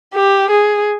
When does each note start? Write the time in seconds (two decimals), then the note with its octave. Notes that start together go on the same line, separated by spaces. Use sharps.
0.15 G4
0.50 G#4